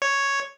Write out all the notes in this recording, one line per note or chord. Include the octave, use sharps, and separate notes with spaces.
C#5